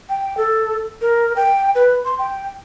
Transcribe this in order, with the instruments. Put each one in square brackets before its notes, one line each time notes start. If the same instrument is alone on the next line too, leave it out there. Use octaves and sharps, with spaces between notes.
[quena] G5
A4
A#4
G5
B4
C6
G5